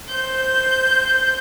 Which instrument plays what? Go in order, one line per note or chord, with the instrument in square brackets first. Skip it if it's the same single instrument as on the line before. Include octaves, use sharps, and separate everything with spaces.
[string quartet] C5 G6